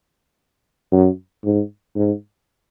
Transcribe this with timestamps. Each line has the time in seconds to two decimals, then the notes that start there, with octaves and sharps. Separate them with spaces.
0.92 F#2
1.44 G#2
1.96 G#2